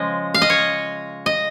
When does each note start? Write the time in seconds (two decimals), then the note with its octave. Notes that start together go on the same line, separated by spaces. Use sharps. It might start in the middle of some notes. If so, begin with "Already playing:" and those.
Already playing: C#3 F3 G#3 D#5
0.34 F5
0.42 D#5
0.50 C#5
1.26 D#5